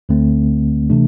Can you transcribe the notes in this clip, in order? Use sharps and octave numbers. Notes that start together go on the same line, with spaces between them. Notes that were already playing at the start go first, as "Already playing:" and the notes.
D2 D3 A3 C4
C3 E3 A3 D4